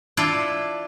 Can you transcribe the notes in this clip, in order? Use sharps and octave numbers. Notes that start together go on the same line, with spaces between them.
D4 E4 F4